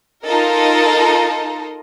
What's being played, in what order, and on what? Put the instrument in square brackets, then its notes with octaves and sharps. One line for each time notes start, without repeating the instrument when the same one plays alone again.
[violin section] D#4 F4 A4 A#4 D#5